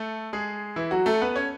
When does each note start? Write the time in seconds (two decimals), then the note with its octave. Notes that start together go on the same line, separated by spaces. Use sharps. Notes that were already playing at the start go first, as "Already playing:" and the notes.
Already playing: A3 A4
0.33 G#3 G#4
0.76 E3 E4
0.91 F#3 F#4
1.06 A3 A4
1.21 B3 B4
1.36 C#4 C#5